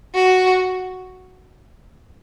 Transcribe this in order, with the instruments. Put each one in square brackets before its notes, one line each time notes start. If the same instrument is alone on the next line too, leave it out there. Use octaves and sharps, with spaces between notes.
[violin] F#4